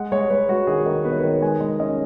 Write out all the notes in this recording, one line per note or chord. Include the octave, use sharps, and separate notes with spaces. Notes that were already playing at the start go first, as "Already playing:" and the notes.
Already playing: G#3 F#5
G#3 C#5
G#3 B4
G#3 F#4
D#3 G#4
D#3
B3 B4
C#5
D#3 B4
G#3 G#5
G#3
C#4 D#5